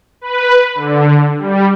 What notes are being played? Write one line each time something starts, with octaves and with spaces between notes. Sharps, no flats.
B4
D3
G3